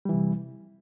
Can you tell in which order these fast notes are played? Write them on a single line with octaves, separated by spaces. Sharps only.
G3 E3 C3